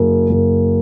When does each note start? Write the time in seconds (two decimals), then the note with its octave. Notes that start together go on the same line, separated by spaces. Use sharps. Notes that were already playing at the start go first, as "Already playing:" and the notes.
Already playing: F#1
0.29 F#1